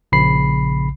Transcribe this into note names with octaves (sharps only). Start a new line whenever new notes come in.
A#1 C#3 B5 C7